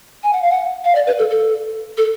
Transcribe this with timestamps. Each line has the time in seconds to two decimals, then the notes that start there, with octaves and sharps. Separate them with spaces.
0.24 G#5
0.33 F#5
0.42 F5
0.51 F#5
0.85 F5
0.95 D5
1.07 B4
1.19 A4
1.30 A4
1.98 A4